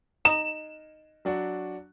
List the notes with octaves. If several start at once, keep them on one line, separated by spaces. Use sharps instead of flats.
D#4 E7
F#3 D4 F#4